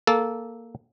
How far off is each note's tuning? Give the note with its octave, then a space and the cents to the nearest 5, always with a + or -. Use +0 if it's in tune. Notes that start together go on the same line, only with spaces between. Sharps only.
A#3 +0 A4 -15